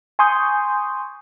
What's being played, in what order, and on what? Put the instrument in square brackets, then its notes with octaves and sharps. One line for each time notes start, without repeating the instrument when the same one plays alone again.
[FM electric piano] G#5 C6 C#6 D#6 G6